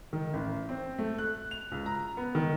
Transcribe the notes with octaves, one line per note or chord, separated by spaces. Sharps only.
D#3
A1
C4
A3
F#6
F7
C#2
A#5
B3
D#3